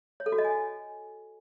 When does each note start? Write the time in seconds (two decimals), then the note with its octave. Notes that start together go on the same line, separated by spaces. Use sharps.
0.20 C#5
0.26 A4
0.32 F#4
0.38 D#5
0.45 G#5